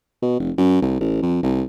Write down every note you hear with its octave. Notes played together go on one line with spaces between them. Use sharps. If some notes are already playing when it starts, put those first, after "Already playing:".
B2
F1
F#2
C2
A1
F2
C2